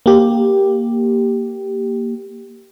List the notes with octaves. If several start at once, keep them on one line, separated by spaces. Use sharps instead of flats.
A#3 G4